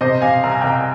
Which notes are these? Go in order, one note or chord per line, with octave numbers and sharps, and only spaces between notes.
C3 C5 D#5
C3 F5 G#5
C2 A#5
G#5
C2 G5 A#5